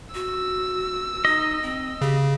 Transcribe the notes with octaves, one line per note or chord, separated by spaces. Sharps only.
F#4 E6
D#4 D#5
C4
C#3 G4